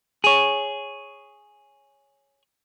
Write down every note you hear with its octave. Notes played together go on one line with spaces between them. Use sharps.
G#4 C#5